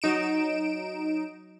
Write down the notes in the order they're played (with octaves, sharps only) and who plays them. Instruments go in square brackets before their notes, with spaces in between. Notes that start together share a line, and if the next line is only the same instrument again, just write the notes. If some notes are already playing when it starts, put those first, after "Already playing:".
[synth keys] F#3 D#4 D7 E7